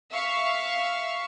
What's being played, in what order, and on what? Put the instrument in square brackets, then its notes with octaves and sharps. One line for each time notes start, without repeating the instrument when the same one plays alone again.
[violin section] E5 F5 C#6